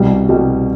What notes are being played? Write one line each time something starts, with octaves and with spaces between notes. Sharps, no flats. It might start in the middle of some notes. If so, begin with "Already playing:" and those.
Already playing: C2 B2 G3
C2 B2 G3